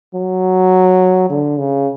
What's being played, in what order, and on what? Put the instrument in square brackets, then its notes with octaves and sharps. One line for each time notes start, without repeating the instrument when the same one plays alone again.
[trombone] F#3
D3
C#3